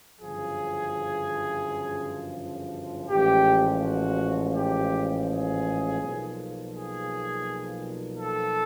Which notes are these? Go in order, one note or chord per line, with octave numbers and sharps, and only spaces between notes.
G1 F#2 C#3 F3 G#4
A1 G#2 F3 G4
F#4
G4
G#4
B1 A#2 F3
G#4
A4